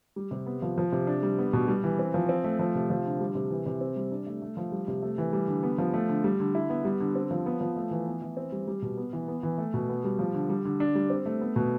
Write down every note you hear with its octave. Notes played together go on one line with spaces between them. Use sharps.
G3
C3
B3
F3
F3
C3
D4
G3
B3
B2
G3
E3
C4
F3
C4
A3
F3
C3
F3
D3
G3
C3
E3
C3
C4
G3
D4
A3
A3
F3
G3
C3
A3
E3
G3
D3
B3
F3
A3
D3
G3
D3
E4
B3
G3
D3
C4
F3
B3
F3
A3
E3
B3
E3
C4
G3
G3
B2
B3
E3
B3
E3
A3
B2
B3
G3
F3
D3
G3
D3
D4
G3
C4
A3
B3
B2